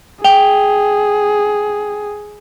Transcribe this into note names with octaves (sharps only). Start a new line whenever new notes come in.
G#4 G5 F7 G7